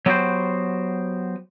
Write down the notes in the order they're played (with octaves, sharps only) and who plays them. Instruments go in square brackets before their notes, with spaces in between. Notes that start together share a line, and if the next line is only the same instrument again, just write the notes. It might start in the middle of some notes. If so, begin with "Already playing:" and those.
[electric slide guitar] F#3 B3 F#4 G4 C5